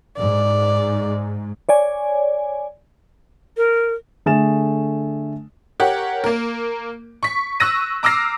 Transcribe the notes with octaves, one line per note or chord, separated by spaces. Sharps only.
G#2 D5
C#5 D5 G#5
A#4
D3 A3 G#4 A6 E7
G4 A#4 C#5 F#5
A#3 A#4
C#6 B6
C#6 E6 F#6 A#6 D#7
A#5 D6 E6 F6 A#6 C7